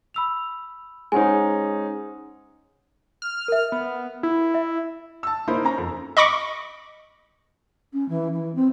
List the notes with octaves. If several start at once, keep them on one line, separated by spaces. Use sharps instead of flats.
B5 E6 F7
G#3 C#4 D#4 C5 F#5 G#5
F6
A#4 E5
B3
E4
E5
A5 E6
A#3 D#4 E4 A#4 C5 B5
C#4 A#5
F2
D#5 B5 C#6 D6
C#4
E3
E3
C4